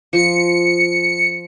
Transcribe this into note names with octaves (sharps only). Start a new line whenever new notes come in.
F3 C#7